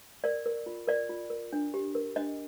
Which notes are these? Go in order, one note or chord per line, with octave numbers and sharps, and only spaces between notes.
A#4 D5
A#4
F4
A#4 D5
F4
A#4
D4
G4
A#4
D4 D#5